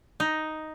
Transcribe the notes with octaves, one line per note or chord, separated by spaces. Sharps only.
D#4